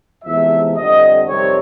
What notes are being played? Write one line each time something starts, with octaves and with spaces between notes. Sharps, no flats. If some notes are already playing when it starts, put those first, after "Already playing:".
E2 C3 F3 G#3 E5
F2 D3 G3 C4 D#5
F2 C3 D#3 G3 C4 C#5